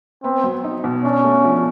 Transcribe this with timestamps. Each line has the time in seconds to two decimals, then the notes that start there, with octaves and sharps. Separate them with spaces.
0.24 B3 C4
0.44 F#3
0.64 D#4
0.84 B2
1.04 C#4 D4
1.24 A3
1.44 F3